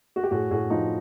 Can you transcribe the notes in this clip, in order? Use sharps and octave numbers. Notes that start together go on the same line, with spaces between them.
F#4
G4
A2 F#4 G#4
A2 F#4 G#4
F3 D#4 F4